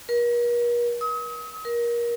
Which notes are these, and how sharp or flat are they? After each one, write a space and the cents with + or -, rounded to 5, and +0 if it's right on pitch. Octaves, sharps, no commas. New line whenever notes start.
A#4 +45
D#6 +40
A#4 +25